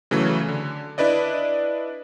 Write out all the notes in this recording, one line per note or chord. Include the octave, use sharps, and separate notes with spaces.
C#3 E3 F#3 A3
D3
D4 E4 B4 D5 D#5